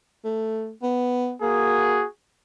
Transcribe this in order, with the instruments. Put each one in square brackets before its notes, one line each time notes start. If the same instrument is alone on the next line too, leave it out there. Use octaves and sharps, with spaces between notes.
[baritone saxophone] A3
B3
[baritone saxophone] A#3 [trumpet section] F#4 G#4